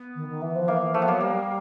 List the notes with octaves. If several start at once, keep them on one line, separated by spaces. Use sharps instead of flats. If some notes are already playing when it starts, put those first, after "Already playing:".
Already playing: B3
D#3
D#3
E3
F3
E3 A#3
E3
F3 A3
B3
F#3 A#3
G3 A#3